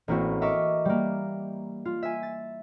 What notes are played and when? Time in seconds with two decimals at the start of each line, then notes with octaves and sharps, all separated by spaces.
0.08 A1 A#3 C4 E4 F#4
0.42 A#4 D#5 E5 C#6 D6
0.85 G3 A#3
1.85 F4
2.03 E5 G#5
2.23 A6